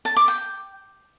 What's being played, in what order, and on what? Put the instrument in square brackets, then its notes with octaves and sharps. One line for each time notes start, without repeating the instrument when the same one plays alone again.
[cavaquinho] A5
D6
G5